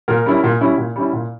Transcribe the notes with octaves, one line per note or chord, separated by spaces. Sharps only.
A#2 A#4
G3 C#4 E4
A#2
G3 C#4 E4
A#2
G3 C#4 E4
A#2